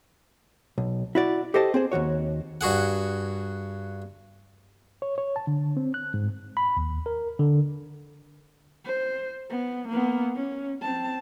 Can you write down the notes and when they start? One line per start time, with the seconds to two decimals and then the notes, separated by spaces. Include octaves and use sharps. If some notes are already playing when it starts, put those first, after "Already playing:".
0.78 B1
1.15 E4 F#4 D5
1.54 G4 A4 C5 D#5 G5 A5
1.74 C4 G#4 C5
1.92 D#2 C3 F#4 C#5
2.61 G2 F#4 G#4 F#5
5.02 C#5
5.18 C#5
5.36 A5
5.47 D3
5.77 C4
5.94 F#6
6.14 G#2
6.57 B5
6.77 D#2
7.06 A#4
7.39 D3
8.85 C5
9.50 B3
9.88 A#3 B3
10.35 C#4
10.81 C4 A5